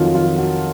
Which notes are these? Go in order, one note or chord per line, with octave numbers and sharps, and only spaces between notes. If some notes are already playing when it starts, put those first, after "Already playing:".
Already playing: F2 D#3 F#3 F4
F4
F#4